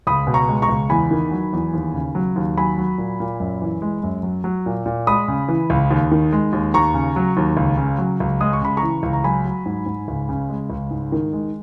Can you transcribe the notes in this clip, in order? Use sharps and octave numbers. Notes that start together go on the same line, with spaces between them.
C#2 B5 D#6
B2
A#5 C#6
G#3
A#5 C#6
C#2
E2 G#5 B5
D#3
F#3
E2
D#2
C#3
F#3
D#2
F#3 G#5 B5
F#3
A#2
A#2
F#2
E3
G#3
F#2
F#3
F#3
A#2
A#2
G#3 B5 D#6
C#3
E3
C#2
D#2
D#3
G#3
D#2
D#2 A#5 C#6
C#3
F#3
D#2
C#2
C#3
F#3
C#2
G#3 D#6
C#6
C#3 B5
A#5 C#6
E3
C#2
A#5
F#3 G#5 B5
F#3
G#2
G#2
C#2
C#3
G#3
C#2
G#2
D#3
G#3